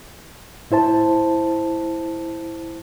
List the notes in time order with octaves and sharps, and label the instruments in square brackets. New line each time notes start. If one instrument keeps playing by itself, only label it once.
[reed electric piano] A2 E4 C5 A5